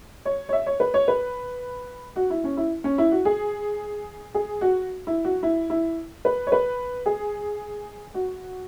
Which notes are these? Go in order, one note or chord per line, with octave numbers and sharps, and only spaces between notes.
C#5
C#5
E5
C#5
B4
C#5
B4
F#4
E4
C#4
E4
C#4
E4
F#4
G#4
G#4
F#4
E4
F#4
E4
E4
B4
C#5
B4
G#4
F#4